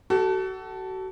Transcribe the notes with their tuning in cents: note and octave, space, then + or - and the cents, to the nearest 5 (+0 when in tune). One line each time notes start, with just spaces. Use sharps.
F#4 +35 A4 +0